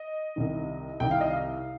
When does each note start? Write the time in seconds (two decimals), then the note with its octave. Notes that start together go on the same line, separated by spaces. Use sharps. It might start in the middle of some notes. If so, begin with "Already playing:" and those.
Already playing: D#5
0.36 C2 C3 D#3
1.00 C2 C3 D#3 G5
1.11 F5
1.21 D#5
1.31 F5